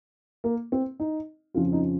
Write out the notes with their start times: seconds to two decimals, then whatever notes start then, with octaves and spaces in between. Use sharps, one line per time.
0.44 A#3
0.72 C4
1.00 D#4
1.54 F2 C#3 F3 F4
1.73 D#4